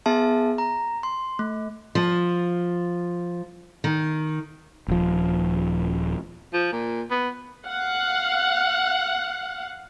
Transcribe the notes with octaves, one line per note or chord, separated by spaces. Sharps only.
B3 G#4 E5 A5
A#5
C6
A3
F3
D#3
D#1 F3
F3
A#2
B3
F5 F#5